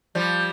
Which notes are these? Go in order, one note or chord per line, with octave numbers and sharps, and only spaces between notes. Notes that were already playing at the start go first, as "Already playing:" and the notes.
F3 G3